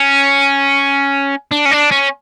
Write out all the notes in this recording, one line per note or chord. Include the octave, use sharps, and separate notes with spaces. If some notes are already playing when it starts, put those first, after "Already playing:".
Already playing: C#4
D4
C#4
D4
C#4